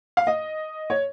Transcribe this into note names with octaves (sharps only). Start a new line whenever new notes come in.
F5
D#5
C#5